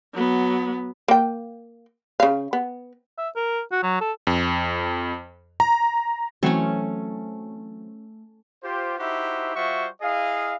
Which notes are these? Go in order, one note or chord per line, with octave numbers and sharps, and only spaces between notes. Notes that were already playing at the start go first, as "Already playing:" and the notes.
F#3 B3
A#3 G5
C#3 F5
B3
E5
A#4
F#4
F#3
A4
F2
A#5
E3 F#3 A3 C4 C#4
F4 G4 C5
D#4 E4 F#4 G4 C5 E5
G3 F4 F#4 C5 E5 C#6
E4 G#4 D#5 F5